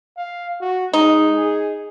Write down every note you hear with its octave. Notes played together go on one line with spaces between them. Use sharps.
F5
F#4
G#3 D#4
G#4